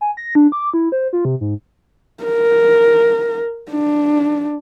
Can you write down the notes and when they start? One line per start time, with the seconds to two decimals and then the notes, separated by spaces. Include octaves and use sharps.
0.01 G#5
0.17 A#6
0.35 D4
0.52 D6
0.74 E4
0.92 C5
1.13 F4
1.25 C3
1.41 G#2
2.24 A#4
3.71 D4